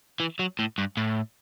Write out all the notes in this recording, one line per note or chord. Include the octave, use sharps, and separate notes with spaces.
E3
F#3
A2
G2
A2